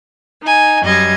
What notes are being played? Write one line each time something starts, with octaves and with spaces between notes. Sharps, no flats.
D#4 G#5
F#2 G3 D#5 G#6